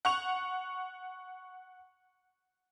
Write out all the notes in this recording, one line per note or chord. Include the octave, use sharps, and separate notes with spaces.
F#5 C#6 F7